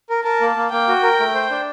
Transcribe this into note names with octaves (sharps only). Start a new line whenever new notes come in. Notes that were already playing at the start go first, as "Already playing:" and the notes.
A#4
A#4 A5
A#3
A#3
A#3 G5
F#4
A#4
A3
C5
D4